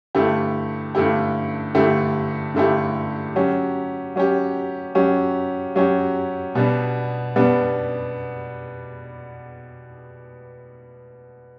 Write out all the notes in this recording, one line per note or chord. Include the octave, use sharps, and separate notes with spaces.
G2 D3 A3 E4 G4
G2 D3 A3 E4 G4
G2 D3 A3 E4 G4
G2 D3 A3 E4 G4
F#3 C#4 G4
F#3 C#4 G4
F#3 C#4 G4
F#3 C#4 G4
B2 G3 B3 D4
B2 G3 B3 D4